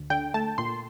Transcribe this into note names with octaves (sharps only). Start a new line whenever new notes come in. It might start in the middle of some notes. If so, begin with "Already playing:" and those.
Already playing: D2
D3 G5
A3 A5
A#2 C6